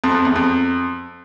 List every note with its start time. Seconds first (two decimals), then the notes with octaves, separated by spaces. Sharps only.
0.04 F2
0.14 F2
0.25 E2
0.36 F2